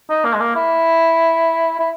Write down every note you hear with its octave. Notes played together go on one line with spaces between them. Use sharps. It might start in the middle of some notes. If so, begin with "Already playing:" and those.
D#4
A#3
G#3
A#3
E4
E4